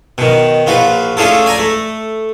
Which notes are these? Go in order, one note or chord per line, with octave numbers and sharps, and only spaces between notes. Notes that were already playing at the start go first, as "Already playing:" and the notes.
B2 D#3
A#1 F4 F#4 B4
A3 C#4 D4 F4 G#4 A4
D5 G#5 A#5
A3